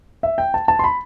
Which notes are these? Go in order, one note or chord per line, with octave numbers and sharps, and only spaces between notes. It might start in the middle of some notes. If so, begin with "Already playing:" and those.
E5
G5
A5
A5
C6
B5